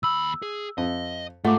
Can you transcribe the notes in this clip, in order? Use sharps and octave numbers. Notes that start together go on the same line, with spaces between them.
D#2 B5 E6
G#4
F2 D#5
G#2 A3 F4 F#5 D6